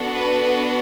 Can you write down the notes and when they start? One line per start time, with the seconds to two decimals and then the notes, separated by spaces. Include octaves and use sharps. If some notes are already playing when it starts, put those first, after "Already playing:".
Already playing: B3 D4 F#4 A4
0.11 B4